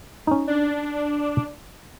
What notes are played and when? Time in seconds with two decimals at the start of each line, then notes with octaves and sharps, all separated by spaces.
0.27 C#4 D#4
0.47 D4